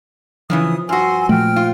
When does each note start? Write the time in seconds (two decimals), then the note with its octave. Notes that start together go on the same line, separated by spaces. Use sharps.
0.50 A2 C#3 E3 F3 D#6
0.89 G2 F#4 G#5 C6 E6
1.29 A#2 F3 A3 G5 F6
1.56 F4